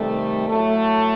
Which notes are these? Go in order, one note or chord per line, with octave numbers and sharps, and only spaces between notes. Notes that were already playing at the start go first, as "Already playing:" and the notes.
Already playing: C3 D#3 G3 A3
A2 F#3 A3